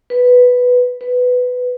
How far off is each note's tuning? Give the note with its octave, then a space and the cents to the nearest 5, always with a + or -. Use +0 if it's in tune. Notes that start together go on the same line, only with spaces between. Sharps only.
B4 +0
B4 +10